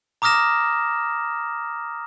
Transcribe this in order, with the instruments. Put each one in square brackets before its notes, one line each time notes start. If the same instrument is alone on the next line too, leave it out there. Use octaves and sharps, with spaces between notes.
[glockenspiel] A#5 D6 D#6 F6 A#6 E7